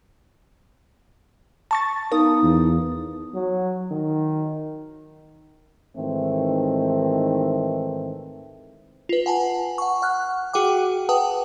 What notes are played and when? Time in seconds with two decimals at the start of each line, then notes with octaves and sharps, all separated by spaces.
1.71 A5 C#6 A6
2.12 B3 D#4 A#4 F5 D#6
2.43 E2
3.34 F#3
3.91 D#3
5.96 G#2 D#3 E3 A3 C4
9.09 F4 B4
9.26 F#5 G#5 A5
9.78 F#5 C#6
10.02 F#5 F6 F#6
10.53 F#4 G#4 F#5 G5 D6
11.09 B4 F#5 G5 A5 D#6